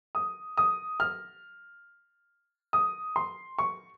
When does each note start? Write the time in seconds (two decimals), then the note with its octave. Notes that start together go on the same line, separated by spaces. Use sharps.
0.15 D#6
0.57 D#6
1.00 F6
2.73 D#6
3.16 C6
3.59 C#6